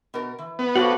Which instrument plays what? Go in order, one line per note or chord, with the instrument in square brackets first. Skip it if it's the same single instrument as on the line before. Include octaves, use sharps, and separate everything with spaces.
[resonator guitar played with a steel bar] B2 A#4
E3
[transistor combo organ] B3
[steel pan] F#4 [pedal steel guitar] A4 D5 F#5 [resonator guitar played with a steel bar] A#4 C5 F5